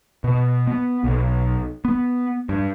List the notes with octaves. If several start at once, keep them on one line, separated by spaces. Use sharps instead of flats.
B2
B3
B1
B3
G2